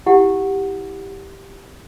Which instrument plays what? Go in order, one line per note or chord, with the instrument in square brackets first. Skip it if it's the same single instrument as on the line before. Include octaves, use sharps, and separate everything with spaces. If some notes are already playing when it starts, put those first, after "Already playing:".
[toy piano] E4 G4 F#5